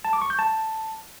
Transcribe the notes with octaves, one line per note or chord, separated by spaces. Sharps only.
A5
D6
C#6
G6
A5